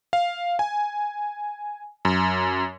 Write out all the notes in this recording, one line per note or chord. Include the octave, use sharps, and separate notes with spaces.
F5
G#5
F#2